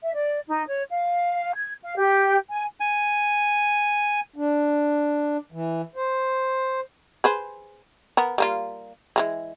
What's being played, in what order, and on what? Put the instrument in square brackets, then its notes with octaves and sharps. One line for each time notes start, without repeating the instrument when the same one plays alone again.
[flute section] E5
D5
D#4
C#5
F5
G#6
F5
G4
G#5
[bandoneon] G#5
[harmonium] D4
E3
C5
[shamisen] G#4 B4 C5
B3 A#4
G3 A#3 F4
E3 G3 G#3